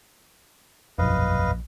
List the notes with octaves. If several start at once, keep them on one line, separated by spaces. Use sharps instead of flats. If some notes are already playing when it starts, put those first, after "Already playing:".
E1 A#1 F#2 B4 D#5 F5